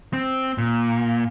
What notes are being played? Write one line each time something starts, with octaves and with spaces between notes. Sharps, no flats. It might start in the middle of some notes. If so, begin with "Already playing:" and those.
C4
A#2